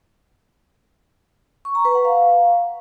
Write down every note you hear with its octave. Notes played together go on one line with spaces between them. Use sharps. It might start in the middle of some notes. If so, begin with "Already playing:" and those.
C#6
A#5
B4
F#5
F5